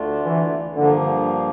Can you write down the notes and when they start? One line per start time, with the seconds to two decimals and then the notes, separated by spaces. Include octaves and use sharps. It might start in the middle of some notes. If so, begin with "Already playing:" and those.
Already playing: D2 D3 A3 D4 F4
0.25 E3
0.74 G2 D3 F3 A#3